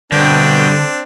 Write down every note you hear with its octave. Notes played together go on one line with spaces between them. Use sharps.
G2 B2 D3 C4 D4 G5